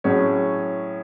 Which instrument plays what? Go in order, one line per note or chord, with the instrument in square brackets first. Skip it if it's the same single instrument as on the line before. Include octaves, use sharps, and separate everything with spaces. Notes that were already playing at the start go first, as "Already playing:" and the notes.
[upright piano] A2 F#3 C#4 G#4